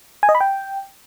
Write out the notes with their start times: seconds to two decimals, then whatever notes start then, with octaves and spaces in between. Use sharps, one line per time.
0.23 G#5
0.29 D#5
0.35 B5
0.41 G5